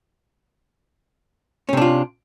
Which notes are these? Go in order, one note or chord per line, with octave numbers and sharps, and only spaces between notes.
C3 C#4 D4 F4